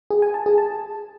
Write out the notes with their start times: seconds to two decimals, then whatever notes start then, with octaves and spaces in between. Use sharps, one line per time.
0.10 G#4
0.22 G#5
0.34 A5
0.46 G#4
0.58 A5